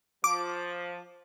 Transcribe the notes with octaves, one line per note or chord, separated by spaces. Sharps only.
F3 D6